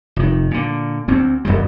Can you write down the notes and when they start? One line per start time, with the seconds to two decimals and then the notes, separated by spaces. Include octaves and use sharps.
0.16 F1 D#3
0.51 A#2 D3
1.08 D2 C4
1.45 D1 C#2 F#2 G3